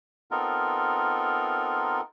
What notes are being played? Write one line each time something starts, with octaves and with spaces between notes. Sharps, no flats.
B3 C4 D#4 F4 A4 A#4